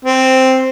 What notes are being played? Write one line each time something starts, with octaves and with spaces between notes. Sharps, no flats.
C4